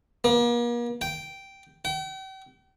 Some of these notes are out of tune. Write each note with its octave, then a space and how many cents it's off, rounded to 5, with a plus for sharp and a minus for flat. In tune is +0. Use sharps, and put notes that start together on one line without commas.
A#3 +40
G5 -5
G5 -40